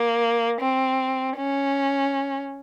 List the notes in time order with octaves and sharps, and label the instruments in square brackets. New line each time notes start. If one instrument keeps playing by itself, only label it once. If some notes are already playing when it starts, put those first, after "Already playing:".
Already playing: [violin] A#3
C4
C#4